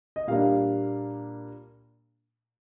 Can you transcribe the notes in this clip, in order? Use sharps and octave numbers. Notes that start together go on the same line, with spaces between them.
D#5
A#2 G3 A#3 D4 F5